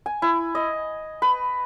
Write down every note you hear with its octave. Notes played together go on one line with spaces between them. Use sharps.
G#5
E4
D#5
B4